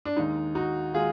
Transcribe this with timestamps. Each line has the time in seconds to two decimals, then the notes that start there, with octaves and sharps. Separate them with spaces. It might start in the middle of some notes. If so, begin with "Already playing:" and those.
0.05 D4
0.17 D#2 D#3 G#3 D#4
0.55 D#4 F#4
0.94 D#3 G#3 F4 G#4